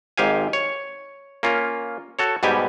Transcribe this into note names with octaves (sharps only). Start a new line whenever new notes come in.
G#1 G#2 G4 F5 G#5
C#5
A#3 C#4 F4
F#4 A4 C#5
G#2 B2 G3 G4 G#5